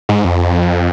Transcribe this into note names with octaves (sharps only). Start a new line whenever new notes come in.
G#2
F2